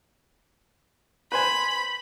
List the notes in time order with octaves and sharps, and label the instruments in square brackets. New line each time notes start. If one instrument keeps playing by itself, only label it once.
[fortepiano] B4 C5 G#5 [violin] B5